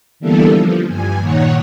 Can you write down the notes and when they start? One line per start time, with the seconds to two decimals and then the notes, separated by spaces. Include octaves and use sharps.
0.20 D3 E3 G3 A#3 B3 A4
0.53 F3
0.86 G2 G#5
1.19 A#2 D#3 C#5 F#5